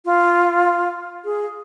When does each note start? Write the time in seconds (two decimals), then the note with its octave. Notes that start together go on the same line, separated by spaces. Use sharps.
0.05 F4
1.25 G#4